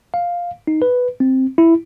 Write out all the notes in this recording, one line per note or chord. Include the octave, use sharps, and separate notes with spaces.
F5
D#4
B4
C4
E4